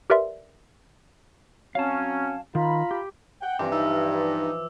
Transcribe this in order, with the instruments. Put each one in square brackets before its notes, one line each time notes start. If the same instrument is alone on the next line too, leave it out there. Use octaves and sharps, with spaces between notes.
[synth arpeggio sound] G4 A#4 B4 D5 E5 C6
[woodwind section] F#3 C4 C#4 [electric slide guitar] F5 A5
[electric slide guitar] D#3 [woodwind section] F4 A#5 B5
[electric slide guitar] G4
[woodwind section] F#5 G5
[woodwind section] G2 [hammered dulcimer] E3 F3 [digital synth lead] C4 [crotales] D6
[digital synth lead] D#4 [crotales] E6